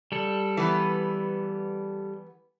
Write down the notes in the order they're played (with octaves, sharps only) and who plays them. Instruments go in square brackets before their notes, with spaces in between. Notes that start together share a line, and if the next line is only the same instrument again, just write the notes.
[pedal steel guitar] G3 A4
[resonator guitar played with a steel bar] E3 B3